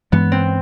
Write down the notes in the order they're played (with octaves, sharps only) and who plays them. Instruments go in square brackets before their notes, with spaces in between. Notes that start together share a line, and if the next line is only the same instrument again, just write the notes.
[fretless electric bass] G2 E3 G#3 [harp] B3
[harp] C4